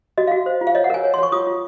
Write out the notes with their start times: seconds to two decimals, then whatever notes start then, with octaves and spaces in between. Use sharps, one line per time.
0.18 F#4 D#5
0.28 F5
0.32 F#4
0.46 C5
0.61 F4
0.67 F5
0.75 C#5 D#5
0.84 F#5
0.90 A#4 G#5
1.04 C#5
1.14 C6
1.18 C#5 C#6
1.32 F4 D#6
1.47 F4